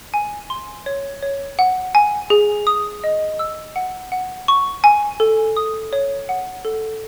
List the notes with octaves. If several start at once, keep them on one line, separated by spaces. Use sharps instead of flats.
G#5
C6
C#5
C#5
F#5
G#5
G#4
D#6
D#5
E6
F#5
F#5
C#6
G#5
A4
D#6
C#5
F#5
A4